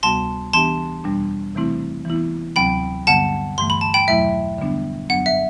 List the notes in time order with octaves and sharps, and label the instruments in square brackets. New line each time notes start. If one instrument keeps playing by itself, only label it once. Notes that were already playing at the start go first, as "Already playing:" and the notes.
[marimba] D2 C3 G3 B3 F#4 [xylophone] A5 C6
[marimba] E3 B3 D4 G4 [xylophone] A5 C6
[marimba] E2 B2 G3 D4
C3 E3 A3 C4 E4
E3 B3 E4
[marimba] D2 C3 F#3 C4 [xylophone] G5 B5
[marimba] G2 D3 G3 B3 [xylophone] F#5 A5
[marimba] G2 E3 A3 [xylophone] C6
[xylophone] B5
A5
G5 B5
[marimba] E2 B2 F#3 A3 E4 [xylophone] E5 G5
[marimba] D3 G3 B3 D4
[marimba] F#2 F#3 B3 D4 [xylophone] F#5
[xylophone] E5